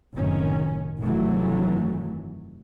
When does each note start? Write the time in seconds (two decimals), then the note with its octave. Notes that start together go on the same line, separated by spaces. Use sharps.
0.15 F#1 F#2 A2 C3 D#3 C#4
1.00 F1 G2 D#3 E3 F#3 A3